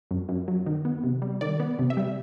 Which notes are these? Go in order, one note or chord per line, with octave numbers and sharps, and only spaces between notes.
F#2
F#2
F#3
D#3
B3
C3
G3
D#3 D5
B3
C3
E5
G3